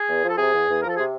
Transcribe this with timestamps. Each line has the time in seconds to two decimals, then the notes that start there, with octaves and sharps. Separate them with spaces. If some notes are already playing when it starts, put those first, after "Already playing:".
Already playing: G#4
0.08 E2
0.22 F3
0.29 A4
0.38 C3 G#4
0.53 E2
0.67 E2
0.82 F3 A#4
0.90 A4
0.97 C3 G#4